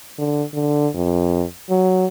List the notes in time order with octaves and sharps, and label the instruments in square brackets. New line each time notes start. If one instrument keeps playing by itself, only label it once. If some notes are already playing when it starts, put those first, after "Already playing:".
[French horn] D3
D3
F2
F#3